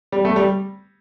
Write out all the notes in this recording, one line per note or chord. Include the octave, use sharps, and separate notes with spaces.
G3
A3
G3